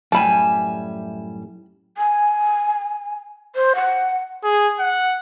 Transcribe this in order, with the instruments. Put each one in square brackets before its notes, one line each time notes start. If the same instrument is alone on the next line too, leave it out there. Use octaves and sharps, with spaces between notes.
[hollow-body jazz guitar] F#2 A2 [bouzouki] G3 E5 G#5 [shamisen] A5 B5
[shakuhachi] G#5
C5
F#5
[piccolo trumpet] G#4
F#5